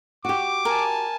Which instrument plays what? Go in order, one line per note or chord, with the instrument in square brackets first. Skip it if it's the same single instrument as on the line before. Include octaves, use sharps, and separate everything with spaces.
[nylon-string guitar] F#4 G4 [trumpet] D6
[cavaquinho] A#4 [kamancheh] G#5 A5